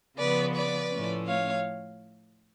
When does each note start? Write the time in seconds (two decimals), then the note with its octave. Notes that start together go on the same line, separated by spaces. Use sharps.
0.19 C#3 F3 B3 B4 D5
0.55 B4 D5
0.91 A2 F3 A3 C#4
1.27 C#5 F5